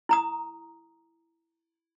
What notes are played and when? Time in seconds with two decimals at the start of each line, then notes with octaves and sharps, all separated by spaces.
0.09 E4 A#5 D#6